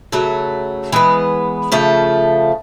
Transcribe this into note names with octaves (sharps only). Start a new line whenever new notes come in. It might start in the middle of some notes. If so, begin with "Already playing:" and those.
C#3 F#3 A3
E3 G#3 B3
C#3 F3 A3